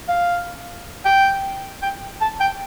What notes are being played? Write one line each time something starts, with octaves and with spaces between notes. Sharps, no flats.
F5
G5
G5
A5
G5